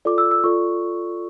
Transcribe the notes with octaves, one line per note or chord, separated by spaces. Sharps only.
F4 A4 D5 D6
E6
E6
F4 A4 D5 C#6